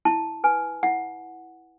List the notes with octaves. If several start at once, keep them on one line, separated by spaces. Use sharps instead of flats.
E4 A5
B4 G#5
E4 F#5